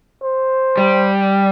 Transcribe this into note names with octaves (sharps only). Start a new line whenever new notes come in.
C5
G3